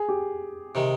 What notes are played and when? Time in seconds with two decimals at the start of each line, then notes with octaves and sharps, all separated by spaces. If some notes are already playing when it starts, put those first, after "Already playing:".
Already playing: G#4
0.09 G4
0.75 C3 D#3 G#3